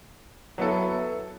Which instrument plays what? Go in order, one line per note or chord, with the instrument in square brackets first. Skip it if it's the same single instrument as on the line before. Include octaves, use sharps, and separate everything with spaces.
[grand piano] F#3 B3 E4 A4